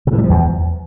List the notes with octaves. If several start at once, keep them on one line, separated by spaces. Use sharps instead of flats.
C3
A2
G3
F3
E2